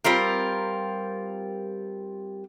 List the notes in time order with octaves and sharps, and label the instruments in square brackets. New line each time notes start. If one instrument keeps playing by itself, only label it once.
[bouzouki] G3 C4 F4 A#4